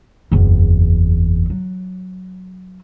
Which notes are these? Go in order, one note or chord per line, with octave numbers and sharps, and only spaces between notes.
F#1 E2
F#3